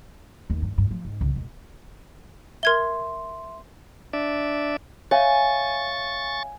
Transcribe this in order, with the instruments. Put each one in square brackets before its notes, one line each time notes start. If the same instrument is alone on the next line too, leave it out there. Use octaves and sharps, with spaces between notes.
[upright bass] D#2
G2
G2
F3
G#2
C#2
E1
[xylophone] A#4 G#6 G7 [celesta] E5 C6
[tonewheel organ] D4 D5 E5
[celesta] C#5 E5 F5 [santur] G#5 [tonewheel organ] C#6 A6